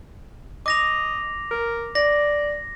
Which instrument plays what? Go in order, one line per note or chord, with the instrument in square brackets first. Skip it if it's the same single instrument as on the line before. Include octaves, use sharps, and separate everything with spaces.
[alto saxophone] D#5 [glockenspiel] D6 A#6 F7
[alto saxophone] A#4
[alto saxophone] D5 [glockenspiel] A#6